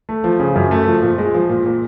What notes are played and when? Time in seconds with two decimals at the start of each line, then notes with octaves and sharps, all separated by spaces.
0.09 A3
0.24 F3
0.40 C#3
0.55 F#2
0.71 A3
0.87 F3
1.02 A#2
1.18 G#3
1.34 F3
1.49 A#2
1.66 A#2